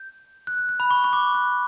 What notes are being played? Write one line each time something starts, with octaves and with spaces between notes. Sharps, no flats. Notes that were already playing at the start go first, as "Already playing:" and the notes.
Already playing: G6
F#6
F#6
F#6
B5
C#6
C#6
D6
F#6